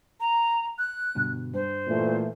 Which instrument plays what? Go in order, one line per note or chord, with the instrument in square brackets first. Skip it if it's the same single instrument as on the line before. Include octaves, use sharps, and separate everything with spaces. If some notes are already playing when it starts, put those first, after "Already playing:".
[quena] A#5
F#6
[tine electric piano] G2 B2 D3
[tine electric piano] G2 [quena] C5
[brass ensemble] A#2 E3 A3